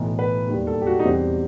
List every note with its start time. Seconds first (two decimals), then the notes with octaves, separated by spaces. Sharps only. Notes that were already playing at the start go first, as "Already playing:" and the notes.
Already playing: B1 A2 E3
0.19 B4
0.47 E1 D#2 D#3 G3
0.67 A4
0.81 G4
0.87 F#4
0.99 D#4
1.05 E2 B2 G3 C4